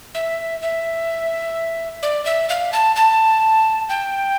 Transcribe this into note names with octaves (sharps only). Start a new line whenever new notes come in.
E5
E5
D5
E5
F5
A5
A5
G5